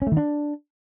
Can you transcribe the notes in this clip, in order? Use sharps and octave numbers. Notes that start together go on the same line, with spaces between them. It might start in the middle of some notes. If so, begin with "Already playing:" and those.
C#4
A3
D#3
D4